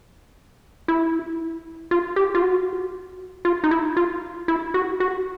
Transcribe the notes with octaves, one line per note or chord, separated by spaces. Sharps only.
E4
F4
G4
F4
F#4
F4
D#4
E4
F4
E4
F#4
F#4